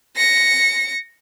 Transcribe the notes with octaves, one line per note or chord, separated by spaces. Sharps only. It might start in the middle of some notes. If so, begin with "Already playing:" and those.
A#6 C#7